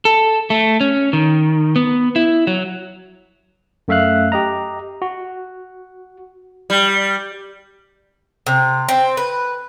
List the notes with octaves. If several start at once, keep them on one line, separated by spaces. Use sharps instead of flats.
A4
A3
C#4
D#3
B3
E4
F#3
F#2 A3 E5 F5 F#6
G4 D#5 A#5
F#4
G3
C3
C4
B4